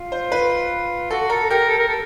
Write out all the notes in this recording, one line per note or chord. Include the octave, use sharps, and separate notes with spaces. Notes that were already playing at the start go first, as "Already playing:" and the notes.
Already playing: F4
C5
B4
F#4 A4
A4 A#4
G4 A#4
A4
A#4
A4